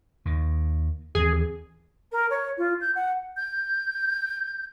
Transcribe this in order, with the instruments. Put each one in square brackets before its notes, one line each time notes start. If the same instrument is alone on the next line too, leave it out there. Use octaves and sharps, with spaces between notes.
[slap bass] D#2 D#3
[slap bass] D#2 E3 C4 [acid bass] G#4
[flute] A#4
C#5
F4
G6
F#5
[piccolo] G6